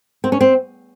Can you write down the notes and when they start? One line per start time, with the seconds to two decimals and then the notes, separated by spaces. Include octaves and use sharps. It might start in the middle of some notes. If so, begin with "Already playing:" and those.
0.24 C4
0.32 C#4
0.41 C4